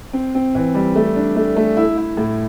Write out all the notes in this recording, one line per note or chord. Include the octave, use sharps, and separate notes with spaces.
C4
C4
E3
G3
A3
D4
A3
A3
E4
E4
A2